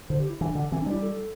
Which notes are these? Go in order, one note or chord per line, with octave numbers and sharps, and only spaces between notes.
D3 C5
G4
E4
E3 D4
D3
E3 C4
D4
G3
E4
A4